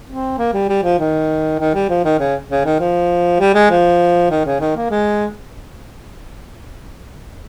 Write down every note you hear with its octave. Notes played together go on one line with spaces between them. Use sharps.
C4
A#3
G3
G3
F3
D#3
D#3
G3
F3
D#3
C#3
C#3
D#3
F3
G3
G#3
F3
D#3
C#3
D#3
A#3
G#3